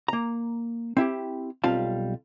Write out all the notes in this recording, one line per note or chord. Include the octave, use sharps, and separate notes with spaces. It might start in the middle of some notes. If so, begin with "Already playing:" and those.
A#3 A#5
C4 E4 G4
B1 G3 C4 F4 F5 A5